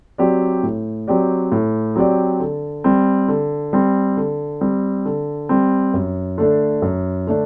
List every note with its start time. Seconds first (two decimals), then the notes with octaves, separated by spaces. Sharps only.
0.18 F#3 C4 G4 D5
0.63 A2
1.08 F#3 C4 G4 D5
1.52 A2
1.96 F#3 C4 G4 D5
2.40 D3
2.84 G3 C4
3.28 D3
3.73 G3 C4
4.17 D3
4.61 G3 C4
5.05 D3
5.49 G3 C4
5.94 F#2
6.38 D3 A3 D4
6.82 F#2
7.27 D3 A3 D4